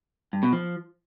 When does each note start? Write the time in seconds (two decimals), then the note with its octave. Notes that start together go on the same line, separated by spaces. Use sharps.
0.33 G2
0.43 B2
0.53 F3